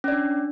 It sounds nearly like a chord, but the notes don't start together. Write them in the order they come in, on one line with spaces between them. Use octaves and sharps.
C#4 D5 D4